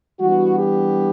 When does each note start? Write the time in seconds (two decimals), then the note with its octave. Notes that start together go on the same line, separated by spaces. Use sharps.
0.20 E3 G3 B3 D4 F#4
0.57 G4